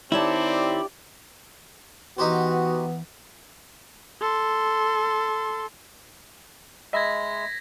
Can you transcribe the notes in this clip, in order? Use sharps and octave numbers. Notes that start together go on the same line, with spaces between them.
D#3 C4 E4 G4 C#5 D5 A5
E3 B3 D#4 F#4 G4 C5
A4 C6
G#3 D#5 E5 B5 G#6 A#6 B6